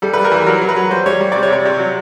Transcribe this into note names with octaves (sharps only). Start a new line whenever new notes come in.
G3 A4
G3 B4
A#4
E3 B4
F#3 A#4
F#3
B4
F#3
G3 C5
G3 C#5
G3
C3 D5
C#5
C3 D5
C3
F#3